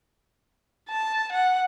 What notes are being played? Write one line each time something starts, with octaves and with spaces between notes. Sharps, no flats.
A5
F#5